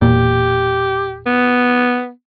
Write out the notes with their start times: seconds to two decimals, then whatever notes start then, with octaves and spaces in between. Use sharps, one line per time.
0.02 E1 A#2 G4
1.26 B3